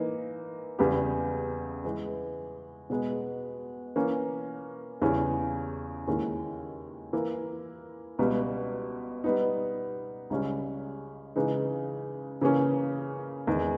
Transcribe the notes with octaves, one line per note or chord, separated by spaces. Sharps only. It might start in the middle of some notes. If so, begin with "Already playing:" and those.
Already playing: E3 A#3 D#4
E2 C#3 G3 B3 G4
E3 G#3 B3
B2 G#3 B3
E3 A#3 C#4
E2 C#3 G3 C#4 E4
D#2 D#3 G#3 C#4 E4
E3 A#3 E4
C#2 B2 G3
G3 B3 D#4
C#2 C#3 G3 C#4
C#3 E3 G#3 D#4
C#3 E3 A#3 C#4 G#4
E2 D#3 G#3